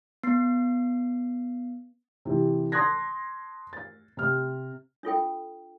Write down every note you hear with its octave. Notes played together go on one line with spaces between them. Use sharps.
B3 C7
C3 E3
A5 C6 D#6 F#6 G#6 A#6
A6
C3 F6
D4 F4 A4 G5